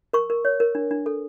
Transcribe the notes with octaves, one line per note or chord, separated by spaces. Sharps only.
A#4 C#6
A#4
C#5
A#4
D4
D4
A4